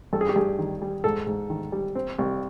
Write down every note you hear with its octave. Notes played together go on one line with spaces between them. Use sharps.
G2 A4
G#4
G4
G2 G#4
D#3
G3
G#2 A4
G#2
D#3
G3
C4
C2